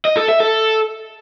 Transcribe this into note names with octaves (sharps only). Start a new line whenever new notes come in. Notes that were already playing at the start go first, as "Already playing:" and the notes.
D#5
A4
E5
A4